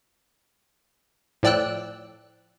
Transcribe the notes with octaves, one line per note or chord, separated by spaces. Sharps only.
A2 F3 D5 G5 E6 F#6